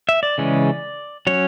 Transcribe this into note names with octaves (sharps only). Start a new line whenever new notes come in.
E5
D5
C#3 E3 G#3 C#4
F#3 C#4 C#5